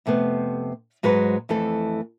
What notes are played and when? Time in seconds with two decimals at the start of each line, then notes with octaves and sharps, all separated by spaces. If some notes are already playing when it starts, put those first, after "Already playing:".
0.06 F2 C3 A3 B3
1.03 G#2 F#3 G#3 B4 C5
1.49 F2 E3 A3 A4